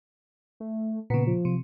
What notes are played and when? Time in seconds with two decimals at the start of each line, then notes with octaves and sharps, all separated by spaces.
0.60 A3
1.10 A#2 C#3 B3
1.27 F3
1.45 C3